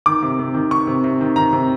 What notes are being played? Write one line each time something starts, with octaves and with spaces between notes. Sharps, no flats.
D#3 D6
C3
C3
D#3
D#3 C#6
C3
C3
D#3
D#3 A#5
C3